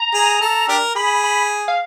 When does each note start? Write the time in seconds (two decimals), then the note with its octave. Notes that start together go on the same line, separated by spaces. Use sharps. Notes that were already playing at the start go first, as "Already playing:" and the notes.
Already playing: A#5
0.14 G#4
0.41 A4
0.68 D4 G4 A#4
0.95 G#4 B5
1.24 B5
1.68 F5